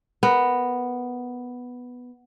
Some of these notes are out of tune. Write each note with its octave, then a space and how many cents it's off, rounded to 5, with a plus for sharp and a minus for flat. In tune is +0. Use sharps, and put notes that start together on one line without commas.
B3 +0 A#4 -5